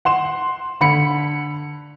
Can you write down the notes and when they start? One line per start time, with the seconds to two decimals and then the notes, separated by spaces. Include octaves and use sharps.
0.05 F#5 C6 E7
0.81 D3 B5 C#7